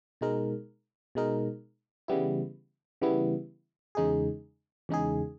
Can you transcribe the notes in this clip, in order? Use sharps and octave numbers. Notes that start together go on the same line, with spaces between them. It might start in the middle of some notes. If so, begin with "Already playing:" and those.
B2 G#3 D#4 A#4
B2 G#3 D#4 A#4
C#3 E3 G3 B3 E4
C#3 E3 G3 B3 E4
E2 C#3 G#3 D#4 G#4
E2 C#3 G#3 D#4 G#4